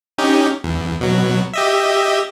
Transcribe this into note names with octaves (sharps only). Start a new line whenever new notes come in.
C#4 D#4 G4
E2
B2 F#3
G4 D#5 E5